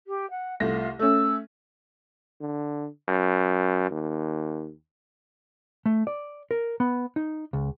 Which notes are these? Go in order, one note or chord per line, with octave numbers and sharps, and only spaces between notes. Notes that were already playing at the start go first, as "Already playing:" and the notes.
G4
F#5
C2 A3 F4 A#6
A3 C#4 E6
D3
F#2
D#2
A3
D5
A#4
B3
D#4
C#2